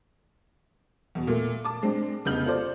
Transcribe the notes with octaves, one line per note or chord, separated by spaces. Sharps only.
E2 B2
A#2 A3
A5 D6
G#3 C4 D4
F1 C#3 B3 F6 G6 F#7
F4 A4 C5 D5